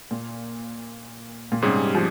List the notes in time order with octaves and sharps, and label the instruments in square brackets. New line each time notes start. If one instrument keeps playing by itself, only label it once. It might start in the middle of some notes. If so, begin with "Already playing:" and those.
[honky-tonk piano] A#2
A#2
[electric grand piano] G#2 G3 C#4 G#4 [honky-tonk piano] C3
[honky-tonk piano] F3